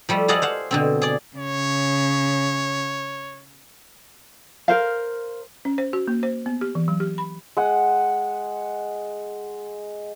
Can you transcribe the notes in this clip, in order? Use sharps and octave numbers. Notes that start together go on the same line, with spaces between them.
F3 G3 A3
G#4 A4 D5 D#5 F5 F#5
C5 F5 F#5
B2 D3 C4
G#4 D5
C#3 C#5
A#4 C5 F5
C#4
C5
F#4
A#3
C5
B3
G4
E3
F#3
G4
B5
G#3 F#5